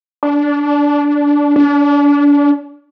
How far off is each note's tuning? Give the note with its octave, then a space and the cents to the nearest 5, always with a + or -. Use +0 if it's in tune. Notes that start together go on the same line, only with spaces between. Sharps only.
D4 -15
D4 -35